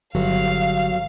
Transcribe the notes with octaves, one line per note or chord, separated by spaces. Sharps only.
G1 F#3 F5